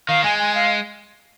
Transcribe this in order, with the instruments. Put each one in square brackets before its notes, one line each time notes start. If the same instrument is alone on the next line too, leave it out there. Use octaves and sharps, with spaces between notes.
[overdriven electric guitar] D#3 [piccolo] F5
[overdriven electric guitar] G#3 [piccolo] G#5
[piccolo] G#5
F5